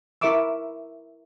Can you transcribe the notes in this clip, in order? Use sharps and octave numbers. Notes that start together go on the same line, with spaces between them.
E4 A#4 E5 C#6 D6 E6